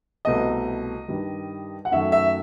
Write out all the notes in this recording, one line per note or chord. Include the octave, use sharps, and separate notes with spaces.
C2 B2 A3 D#5
G2 D#3 G3
F#5
F#2 D#3 F#3 A3 E5
E5